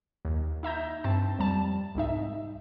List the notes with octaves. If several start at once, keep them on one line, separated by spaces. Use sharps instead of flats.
D#2
D#4 E5 A#5 G6
G2 C4 A5
F2 G3 A5
C2 G#2 D#4 E5